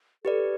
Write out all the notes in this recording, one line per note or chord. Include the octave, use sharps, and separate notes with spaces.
G4 A4 B4 D5